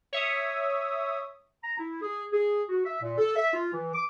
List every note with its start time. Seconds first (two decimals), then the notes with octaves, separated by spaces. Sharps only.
0.13 C#5 E5 D#6
1.64 A#5
1.78 E4
2.02 G#4
2.32 G#4
2.69 F#4
2.85 E5
3.02 A#2
3.18 A4
3.36 E5
3.54 F4
3.73 E3
3.93 D6